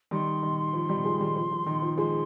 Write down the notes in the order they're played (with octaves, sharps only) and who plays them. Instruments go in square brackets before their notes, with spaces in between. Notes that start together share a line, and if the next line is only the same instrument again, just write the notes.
[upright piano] D#3 G3 [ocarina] C6
[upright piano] D#3
F3
D#3 G3
F3 G#3
D#3 G3
F3
F3
D#3
F3
[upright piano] F3 G#3 [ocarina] C6